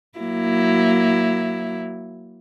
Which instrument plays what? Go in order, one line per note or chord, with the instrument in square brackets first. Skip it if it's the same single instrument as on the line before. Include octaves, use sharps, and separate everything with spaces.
[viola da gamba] F#3 A#3 E4